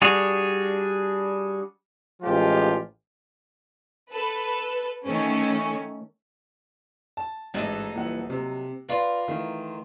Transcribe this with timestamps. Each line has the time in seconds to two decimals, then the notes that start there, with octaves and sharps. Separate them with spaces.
0.02 G3 D4 F#4 G#4
2.23 A1 F3 G#3 F4 G4
4.11 A4 B4
5.06 D#3 A3 C#4
7.17 A5
7.54 A1 G#2 F#3 D#4 A4
7.95 D#1 E3 F#5
8.30 C3
8.89 F4 A#4 B4 D5
9.28 D#3 E3 A3